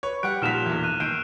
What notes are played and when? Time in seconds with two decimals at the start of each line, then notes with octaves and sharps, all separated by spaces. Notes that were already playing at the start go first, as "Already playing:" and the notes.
0.03 B4 C#5
0.23 G3 F#5 G5 F#6 D7
0.42 A#2 D#3 F3 G3 F6 B6 E7 F7
0.66 B1 E2
0.83 F#6 D#7
1.00 D#2 G6 C7 D7